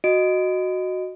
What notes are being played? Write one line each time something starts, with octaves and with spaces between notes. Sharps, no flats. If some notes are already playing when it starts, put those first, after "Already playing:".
F#4 D#5 D7